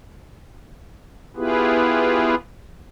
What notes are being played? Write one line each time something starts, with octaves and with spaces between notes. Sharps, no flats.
B3 E4 F4 G4 G#4 B4